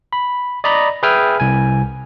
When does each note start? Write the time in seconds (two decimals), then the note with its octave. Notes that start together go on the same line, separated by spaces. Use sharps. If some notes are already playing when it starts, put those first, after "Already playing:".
0.13 B5
0.64 D5 D#5 A#5 B5
1.03 G#4 B4 E5 G5 G#5 F6
1.40 C2 G#5